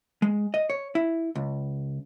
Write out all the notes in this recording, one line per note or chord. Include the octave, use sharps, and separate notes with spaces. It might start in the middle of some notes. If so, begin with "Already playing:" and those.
G#3
D#5
C#5
E4
C#2